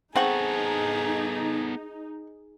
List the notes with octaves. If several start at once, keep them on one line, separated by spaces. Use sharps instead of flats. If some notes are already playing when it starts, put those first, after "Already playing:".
B3 C4 D#4 G#4 A4 F#5 C#6